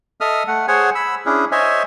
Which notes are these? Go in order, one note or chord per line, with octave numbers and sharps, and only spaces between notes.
A4 D#5 E5 D#6 F6
A3 F#5
G#4 C5 C#5 F#5 G#5
B5 E6
C#4 D4 E4 G#4
C5 C#5 D#5 E5 G#5